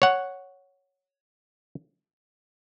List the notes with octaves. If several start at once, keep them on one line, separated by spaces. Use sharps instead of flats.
C#5 F#5